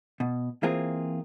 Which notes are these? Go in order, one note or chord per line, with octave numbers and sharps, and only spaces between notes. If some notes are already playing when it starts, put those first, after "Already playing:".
B2
E3 A#3 C4 F4 G#4